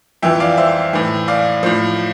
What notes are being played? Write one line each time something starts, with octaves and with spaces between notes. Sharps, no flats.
F2 E3 E5 G5
D5 F5
C5 E5
A2 E3
D5 F5
A2 F3